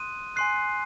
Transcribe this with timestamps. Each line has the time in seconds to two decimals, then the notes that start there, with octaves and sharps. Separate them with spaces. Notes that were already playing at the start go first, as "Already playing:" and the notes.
Already playing: C6 D#6 F#6 D#7
0.36 G#5 C6 F#6 C7